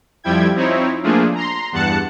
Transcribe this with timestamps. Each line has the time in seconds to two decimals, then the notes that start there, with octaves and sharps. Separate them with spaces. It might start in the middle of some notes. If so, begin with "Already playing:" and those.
0.24 F2 F3 G3 E4 G5 G#6
0.55 F3 C4 D#4 E4 C#5
1.03 F3 A3 A#3 D4 F4 G#4
1.35 A#5 C6
1.72 E2 G2 F#5 A5 F#6 C#7